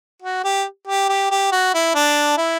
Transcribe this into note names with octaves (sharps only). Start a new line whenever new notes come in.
F#4
G4
G4
G4
G4
F#4
E4
D4
E4